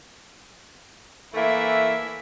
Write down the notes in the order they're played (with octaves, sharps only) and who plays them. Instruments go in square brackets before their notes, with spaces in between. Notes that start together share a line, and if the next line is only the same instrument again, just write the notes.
[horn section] E3 A3 A#3 [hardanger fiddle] E4 E5